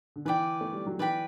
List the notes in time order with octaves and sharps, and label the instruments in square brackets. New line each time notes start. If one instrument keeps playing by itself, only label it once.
[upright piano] D3
[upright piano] E3 [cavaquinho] B4 D5 G5
[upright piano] A3
G3
F#3
[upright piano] E3 [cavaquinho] B4 D5 G5 B5